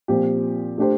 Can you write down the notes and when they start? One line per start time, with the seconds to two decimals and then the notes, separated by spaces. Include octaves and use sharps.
0.08 A#2 F3 C4 G4
0.78 A3 D4 G4 C5